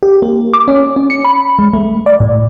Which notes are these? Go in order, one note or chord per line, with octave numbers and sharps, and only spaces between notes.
G4
A#3
D6
C#4
C#4
C#7
B5
G#3
A3
D5
A2